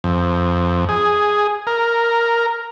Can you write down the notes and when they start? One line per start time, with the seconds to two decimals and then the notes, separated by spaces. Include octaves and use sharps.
0.04 F2
0.89 G#4
1.67 A#4